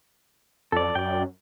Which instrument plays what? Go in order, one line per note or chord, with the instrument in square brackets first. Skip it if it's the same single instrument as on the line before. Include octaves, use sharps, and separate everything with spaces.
[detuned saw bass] F2 [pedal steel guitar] A4 D5
[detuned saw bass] F#2 [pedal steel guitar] D5 G5